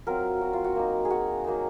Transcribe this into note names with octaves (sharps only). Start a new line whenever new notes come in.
F#3 C4 F4 A#4
F#4
F4
F#4
A#3 D#4
G#4
F#4
F#3 A#3 D#4